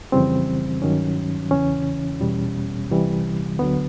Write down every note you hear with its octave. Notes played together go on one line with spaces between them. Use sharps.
F2 C#3 E3 G3 C4
G2 D#3 F#3 C#4
E2 C#3 E3 C#4
E2 B2 G3
C2 C3 E3 G3
D2 D3 F#3 B3